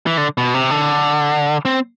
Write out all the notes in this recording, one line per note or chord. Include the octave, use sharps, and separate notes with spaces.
E3
D3
B2
C3
D3
C4